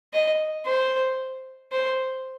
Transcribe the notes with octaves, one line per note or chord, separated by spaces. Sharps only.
D#5
C5
C5